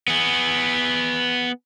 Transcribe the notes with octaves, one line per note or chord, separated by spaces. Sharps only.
B3 G#4